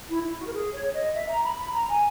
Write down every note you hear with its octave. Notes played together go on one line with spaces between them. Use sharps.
E4
E4
F#4
A#4
G#4
C#5
D#5
E5
A#5
B5
B5
A#5
G#5